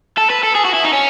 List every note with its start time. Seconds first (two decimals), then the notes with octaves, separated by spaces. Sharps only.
0.18 A4
0.30 B4
0.43 A4
0.55 G#4
0.65 F#4
0.74 E4
0.85 D#4
0.93 C#4